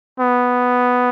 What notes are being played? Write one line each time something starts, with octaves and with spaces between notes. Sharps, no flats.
B3